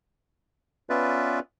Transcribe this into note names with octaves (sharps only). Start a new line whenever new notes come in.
B3 C#4 F4 B4 D5 E5